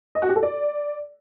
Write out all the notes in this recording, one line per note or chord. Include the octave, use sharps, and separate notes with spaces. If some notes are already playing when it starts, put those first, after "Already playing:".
D#5
F#4
G4
A4
D5